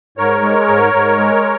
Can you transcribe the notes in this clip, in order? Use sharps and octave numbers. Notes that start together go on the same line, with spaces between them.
G#2 A#4 C#5
G#3
G#2
G#2
G#3